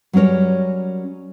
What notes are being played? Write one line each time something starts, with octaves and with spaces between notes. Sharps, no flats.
F#3 G3 C#4 A#4 C#5